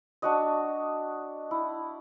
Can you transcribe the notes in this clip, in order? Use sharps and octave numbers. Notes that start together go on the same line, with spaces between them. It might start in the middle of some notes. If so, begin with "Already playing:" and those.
D4 F#4 D#5
E4